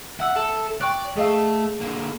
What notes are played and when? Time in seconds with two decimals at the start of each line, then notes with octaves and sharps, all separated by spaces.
0.20 E5 F#5 E6
0.36 A4
0.81 D5 G5 C#6 F#6
1.17 A3 G#4 D#5 F5
1.81 D3 A#3